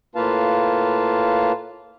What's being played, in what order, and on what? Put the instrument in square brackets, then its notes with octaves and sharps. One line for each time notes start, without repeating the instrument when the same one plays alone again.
[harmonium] A2 A#3 F4 B4 F5 A5